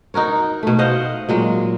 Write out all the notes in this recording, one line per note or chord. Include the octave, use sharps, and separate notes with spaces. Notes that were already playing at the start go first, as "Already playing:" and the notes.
D#4 F#4 A#4 C#5
B2 A3
C5 D#5 F5 F#5
A#2 F#3 G#3